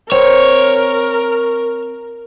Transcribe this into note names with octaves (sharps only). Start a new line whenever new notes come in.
C4 A#4 C#5